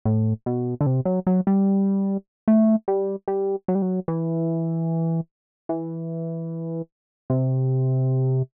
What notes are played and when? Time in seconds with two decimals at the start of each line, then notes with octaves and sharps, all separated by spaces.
0.05 A2
0.46 B2
0.81 D3
0.87 C3
1.05 F#3
1.27 F#3
1.47 G3
2.48 A3
2.88 G3
3.28 G3
3.68 F#3
3.75 G3
3.82 F#3
4.08 E3
5.69 E3
7.30 C3